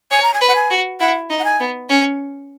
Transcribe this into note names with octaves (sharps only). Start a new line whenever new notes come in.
C#5 G#5
A#5
G#5
B4
F#5
G#5
F#4
E4 F#5
D#4
F#5
G#5
B3
C#4